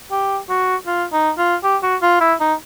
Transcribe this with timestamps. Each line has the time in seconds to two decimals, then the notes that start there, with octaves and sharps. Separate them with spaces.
0.11 G4
0.49 F#4
0.87 F4
1.13 D#4
1.38 F4
1.64 G4
1.83 F#4
2.02 F4
2.21 E4
2.40 D#4